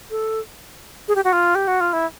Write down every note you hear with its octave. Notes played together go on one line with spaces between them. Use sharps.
A4
G#4
G4
F#4
F4
G4
F#4
F4
E4